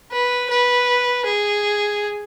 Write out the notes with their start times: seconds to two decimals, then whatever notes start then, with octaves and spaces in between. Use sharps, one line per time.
0.12 B4
0.50 B4
1.25 G#4